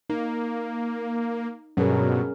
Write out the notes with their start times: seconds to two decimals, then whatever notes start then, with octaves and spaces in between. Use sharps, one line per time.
0.10 A#3 D#4
1.77 G2 B2 F#3 C#4 G#4 A#4